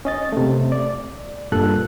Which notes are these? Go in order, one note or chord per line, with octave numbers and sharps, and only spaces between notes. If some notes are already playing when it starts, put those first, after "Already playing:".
C#4 D#5 A6
C3 A3
D5
G2 A#2 A4 F#6